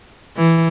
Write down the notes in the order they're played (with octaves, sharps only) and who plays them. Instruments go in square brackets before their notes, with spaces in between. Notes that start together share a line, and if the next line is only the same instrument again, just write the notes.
[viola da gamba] E3